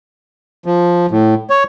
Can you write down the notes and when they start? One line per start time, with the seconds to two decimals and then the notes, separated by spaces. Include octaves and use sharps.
0.66 F3
1.11 A2
1.50 C#5